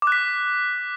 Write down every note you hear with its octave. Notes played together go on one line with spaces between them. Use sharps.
D6 F#6 B6